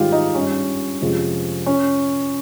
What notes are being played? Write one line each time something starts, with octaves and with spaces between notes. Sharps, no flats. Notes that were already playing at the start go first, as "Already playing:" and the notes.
Already playing: G#2 D#3 G3 F4 G4
D#4
G2 G3 C#4
F2 C3 F3 G#3
C#4